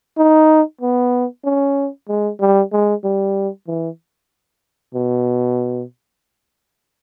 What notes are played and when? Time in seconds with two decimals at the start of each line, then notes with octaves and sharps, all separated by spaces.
0.18 D#4
0.81 B3
1.45 C#4
2.09 G#3
2.40 G3
2.73 G#3
3.04 G3
3.67 E3
4.95 B2